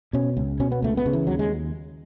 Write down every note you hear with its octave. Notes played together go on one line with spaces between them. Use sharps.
B2 C#4
C#2
B2 C#4
B3
C#2 A3
B3
C#3
E3
D#2 F#3
G#3